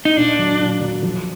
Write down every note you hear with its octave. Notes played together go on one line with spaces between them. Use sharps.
D#4
A#2 D4
F#3
A#2
F#3
F3